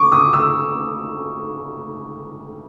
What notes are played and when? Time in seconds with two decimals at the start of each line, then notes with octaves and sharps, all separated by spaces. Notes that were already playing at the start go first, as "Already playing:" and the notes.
Already playing: C#6 D6
0.12 D#6
0.33 E6